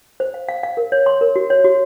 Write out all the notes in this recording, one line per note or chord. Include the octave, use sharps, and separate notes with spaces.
C5
F5
F5
F5
A#4
C#5
C6
A#4
F#4
C#5
F#4